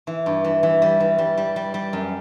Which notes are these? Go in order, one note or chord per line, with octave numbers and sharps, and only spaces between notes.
E3
G2
E3
E3
G3
E3
G3
G3
G3
G3
F#2